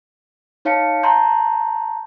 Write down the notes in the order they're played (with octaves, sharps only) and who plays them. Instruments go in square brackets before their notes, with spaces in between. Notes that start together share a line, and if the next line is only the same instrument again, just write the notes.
[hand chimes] D#4 C#5 F5 A5 C#7
A5 A#5 C6 G6